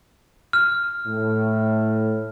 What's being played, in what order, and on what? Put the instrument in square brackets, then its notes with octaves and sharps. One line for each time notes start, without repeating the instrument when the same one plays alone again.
[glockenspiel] F6
[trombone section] A2